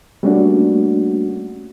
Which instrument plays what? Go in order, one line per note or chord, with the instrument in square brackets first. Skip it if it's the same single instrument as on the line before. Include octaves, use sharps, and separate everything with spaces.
[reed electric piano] G3 A3 A#3 C#4 D4 F#4